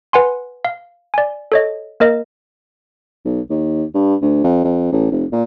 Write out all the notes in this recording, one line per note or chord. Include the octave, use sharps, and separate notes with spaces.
B4 F#5 G#5 C6
F5
D5 G#5
A4 C#5 D#5
A#3 A#4 D#5
B1
D#2
G2
D2
F2
F2
A1
F1
A#2